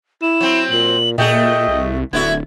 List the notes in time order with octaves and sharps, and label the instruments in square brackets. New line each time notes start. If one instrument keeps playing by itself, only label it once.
[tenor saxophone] E4 [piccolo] E7
[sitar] F#3 C4
[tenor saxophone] A#2 [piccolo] F#7
[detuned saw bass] A#2 [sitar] A3 F#4 G#4 [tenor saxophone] D#5 [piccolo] G5
[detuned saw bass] C2
[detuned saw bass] D1 [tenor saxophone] D3 [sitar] B3 E4 F#4 [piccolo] G#6